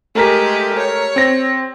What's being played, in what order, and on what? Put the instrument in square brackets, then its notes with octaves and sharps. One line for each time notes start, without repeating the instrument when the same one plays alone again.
[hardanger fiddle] G#3 G4 [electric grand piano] A3 A#4 B6
[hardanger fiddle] C#5
[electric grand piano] C4 A#6